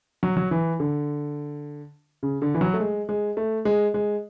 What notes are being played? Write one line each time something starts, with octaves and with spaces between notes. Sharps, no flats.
F#3
F#3
E3
D3
C#3
D3
E3
F#3
A3
G#3
G#3
A3
G#3
G#3